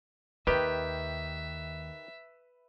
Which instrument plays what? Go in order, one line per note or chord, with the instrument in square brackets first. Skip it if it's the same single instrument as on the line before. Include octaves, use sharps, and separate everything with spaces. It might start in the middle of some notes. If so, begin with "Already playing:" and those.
[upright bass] D#2 [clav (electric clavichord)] D#3 G4 [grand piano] B4 [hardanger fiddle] E5